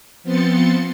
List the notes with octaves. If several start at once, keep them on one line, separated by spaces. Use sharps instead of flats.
F3 B3 C4 C6 A6 C#7